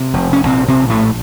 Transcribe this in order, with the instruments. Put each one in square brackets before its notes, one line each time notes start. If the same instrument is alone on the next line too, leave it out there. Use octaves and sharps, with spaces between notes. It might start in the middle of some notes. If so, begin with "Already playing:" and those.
Already playing: [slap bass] C3
F1
C#4
A#1 C3 C4
C3 C4
A#1
A2 A3